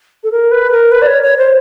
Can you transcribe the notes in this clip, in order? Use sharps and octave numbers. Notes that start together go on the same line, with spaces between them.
A4
A#4
B4
A#4
B4
D5
C#5
C#5
C5